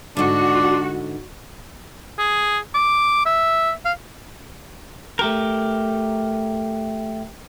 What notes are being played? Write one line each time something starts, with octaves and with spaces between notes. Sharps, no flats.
G#2 D3 D4 F#4
G#4
D6
E5
F5
A3 G4 A#4